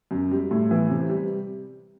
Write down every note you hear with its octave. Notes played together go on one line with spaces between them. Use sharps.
F#2
G3
A2
E3
C3
G3